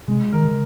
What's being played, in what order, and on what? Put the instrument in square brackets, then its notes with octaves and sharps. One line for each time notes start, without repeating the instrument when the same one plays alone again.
[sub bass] C3 [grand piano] G#3
[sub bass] D#3 [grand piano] A#4
[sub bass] C#3